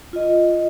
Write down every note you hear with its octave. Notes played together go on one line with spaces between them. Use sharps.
F4 D#5